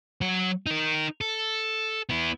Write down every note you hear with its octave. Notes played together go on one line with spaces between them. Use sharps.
F#3 F#5
D#4 A#4
A4
B3 E4